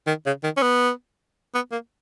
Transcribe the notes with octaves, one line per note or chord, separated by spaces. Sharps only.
D#3
C#3
D#3
C#4
B3
B3
A#3